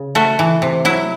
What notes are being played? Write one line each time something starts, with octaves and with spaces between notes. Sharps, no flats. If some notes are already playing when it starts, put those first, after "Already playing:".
Already playing: C#3
A3 F#4
E3
C3
F#3 E4